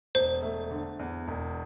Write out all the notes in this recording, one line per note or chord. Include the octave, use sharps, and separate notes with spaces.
E1 C5
A3
D3
E2
E1